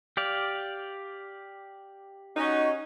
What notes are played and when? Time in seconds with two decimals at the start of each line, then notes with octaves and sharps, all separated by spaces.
0.17 G4 D5 F5
2.37 C#4 D#4 F#4